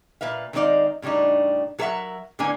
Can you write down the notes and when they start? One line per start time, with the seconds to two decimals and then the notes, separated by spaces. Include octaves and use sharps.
0.21 A#2 B4 E5 F5
0.53 D#3 G#3 C4 D#4 D5 F5
1.02 A2 C#3 G3 D4 D#4
1.79 F#3 A4 A#4 C5 E5 F#5
2.39 A2 D3 A#3 B3 D4 G#5